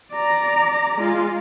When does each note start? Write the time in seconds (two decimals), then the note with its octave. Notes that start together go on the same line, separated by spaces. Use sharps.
0.13 D5 A#5
0.96 G#3 F4